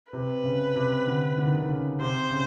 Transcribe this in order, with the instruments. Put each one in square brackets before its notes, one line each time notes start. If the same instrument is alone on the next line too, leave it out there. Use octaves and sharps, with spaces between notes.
[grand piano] C3 [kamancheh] B4
[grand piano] C#3
C3
D3
D3
D#3
D3
C#3
[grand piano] C3 [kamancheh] C5
[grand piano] C#3